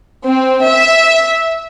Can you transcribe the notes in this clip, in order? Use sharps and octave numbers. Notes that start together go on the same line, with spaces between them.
C4
E5